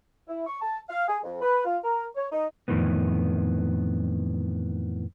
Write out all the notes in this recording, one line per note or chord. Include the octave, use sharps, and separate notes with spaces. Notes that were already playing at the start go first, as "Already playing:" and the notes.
E4
C#6
A5
F5
G#4
F2
B4
F4
A#4
C#5
D#4
F2 A2 D#3 E3 B3